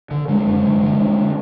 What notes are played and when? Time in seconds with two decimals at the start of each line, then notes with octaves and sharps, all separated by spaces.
0.11 D3
0.28 D3 G#3
0.46 F#2
0.65 D3
0.83 D3
1.00 D3